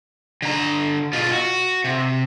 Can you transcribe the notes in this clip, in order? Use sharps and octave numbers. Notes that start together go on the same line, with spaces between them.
D3 A#5
B2 F4
F#4
C3